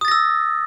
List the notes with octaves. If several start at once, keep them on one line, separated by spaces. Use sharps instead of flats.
D#6 E6 A6 A#6